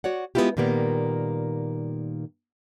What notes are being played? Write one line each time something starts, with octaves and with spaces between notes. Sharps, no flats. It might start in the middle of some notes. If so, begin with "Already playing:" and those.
F#4 C#5 D5 F#5
G#3 B3 C#4 E4 F4 G4
A#2 D#3 G3 A#3 B3